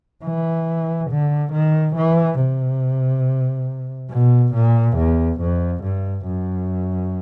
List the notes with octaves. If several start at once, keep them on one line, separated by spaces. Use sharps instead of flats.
E3
D3
D#3
E3
C3
B2
A#2
E2
F2
G2
F#2